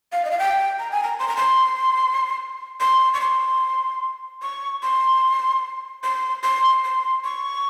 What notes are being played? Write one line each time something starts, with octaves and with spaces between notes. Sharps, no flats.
F5
D#5
F5
G5
A#5
G#5
A#5
C6
A#5
C6
C6
C#6
C6
C#6
C6
C6
C6
C6
C#6